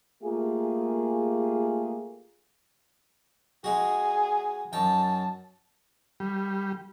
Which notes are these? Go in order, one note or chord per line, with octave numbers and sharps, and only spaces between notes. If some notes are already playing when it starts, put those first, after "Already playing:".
A3 A#3 F4 G4 G#4
G#3 D#4 F#4 G#4
F#2 D#4 G5 A5
G3